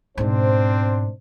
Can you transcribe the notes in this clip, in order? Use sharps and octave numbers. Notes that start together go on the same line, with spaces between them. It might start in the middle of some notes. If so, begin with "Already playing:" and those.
G#2 B2 C4 D4 C5